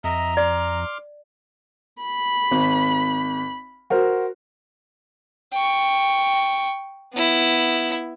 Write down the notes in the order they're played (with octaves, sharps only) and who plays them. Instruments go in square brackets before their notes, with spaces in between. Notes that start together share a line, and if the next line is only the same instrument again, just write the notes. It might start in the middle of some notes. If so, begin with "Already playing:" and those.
[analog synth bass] F2 [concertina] D#5 E5 [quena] A#5
[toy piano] D5 [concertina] C6 D6 F6
[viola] B5
[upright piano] G#1
F#4 A#4 C5
[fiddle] G5 C#6
B3 E4